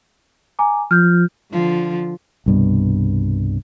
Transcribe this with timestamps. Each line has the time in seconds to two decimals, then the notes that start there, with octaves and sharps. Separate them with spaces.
0.59 G#5 A#5 D6
0.91 F3 F6 G6
1.52 D3 F3
2.46 C2 G2 B2